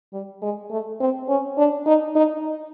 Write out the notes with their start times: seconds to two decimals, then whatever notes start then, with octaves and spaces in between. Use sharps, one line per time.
0.13 G3
0.42 G#3
0.71 A3
1.00 C4
1.29 C#4
1.58 D4
1.86 D#4
2.15 D#4